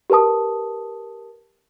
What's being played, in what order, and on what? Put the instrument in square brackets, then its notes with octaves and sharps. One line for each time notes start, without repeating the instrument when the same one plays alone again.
[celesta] G4 A#4 B4 A5 D#6